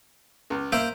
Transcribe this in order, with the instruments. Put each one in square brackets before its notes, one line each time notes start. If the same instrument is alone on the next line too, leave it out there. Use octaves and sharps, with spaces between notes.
[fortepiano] C#2
[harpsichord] A#3 C5 G5 [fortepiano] E5